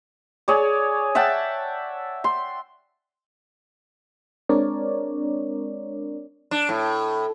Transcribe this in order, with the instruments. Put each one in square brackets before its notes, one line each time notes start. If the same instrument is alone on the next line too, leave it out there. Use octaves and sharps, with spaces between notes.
[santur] G#4 C#5 D5
E5 F#5 G5 A5
C6
[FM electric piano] G#3 C4 D4 A#4 C#5 D5
[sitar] D4
A2